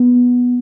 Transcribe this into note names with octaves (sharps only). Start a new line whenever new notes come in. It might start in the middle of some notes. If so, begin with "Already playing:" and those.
Already playing: B3